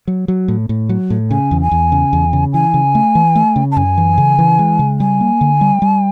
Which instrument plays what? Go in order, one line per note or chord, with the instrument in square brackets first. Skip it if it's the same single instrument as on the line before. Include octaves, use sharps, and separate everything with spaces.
[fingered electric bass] F#3
F#3
A2
A2
F#3
A2
[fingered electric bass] C#3 [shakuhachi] G#5
[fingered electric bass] E2
[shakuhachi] G#5
[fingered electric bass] E2
C#3
E2
C#3
[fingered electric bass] E3 [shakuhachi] G#5
[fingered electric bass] C#3
A3
E3
A3
C#3
[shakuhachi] A5
[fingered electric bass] F#2 [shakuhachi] G#5
[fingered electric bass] E3
C#3
E3
G#3
C#3
[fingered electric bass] G3 [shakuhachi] G#5
[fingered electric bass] A#3
D3
G3
G3